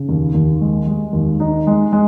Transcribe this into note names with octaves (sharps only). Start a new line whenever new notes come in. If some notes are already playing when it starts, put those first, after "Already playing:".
Already playing: C#3
D#2
D#2
G#3
G#3
D#2
D#4
G#3
G#3